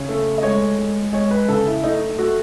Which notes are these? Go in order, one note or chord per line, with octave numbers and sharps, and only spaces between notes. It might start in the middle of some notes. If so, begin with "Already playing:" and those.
Already playing: C#3 C#5
A3
D#5
G#3 C#5
G#3
G#3 C#5
B4
C#3 A4
E4
A3 D#4
A3 F#4